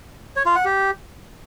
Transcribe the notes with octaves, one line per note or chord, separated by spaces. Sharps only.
C#5
F4
F#5
G4